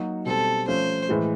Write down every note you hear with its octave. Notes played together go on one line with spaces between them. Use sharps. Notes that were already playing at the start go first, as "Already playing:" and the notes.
Already playing: F#3 A#3 D#4 F#4
B2 G3 C4 A4
F3 A3 C#4 C5
A2 E3 G#3